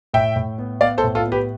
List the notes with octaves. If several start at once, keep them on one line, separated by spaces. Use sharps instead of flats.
A2 E5 G5
A2
B3
B3 D5 F5
A4 C5
A2
F4 A4
B3
G4 B4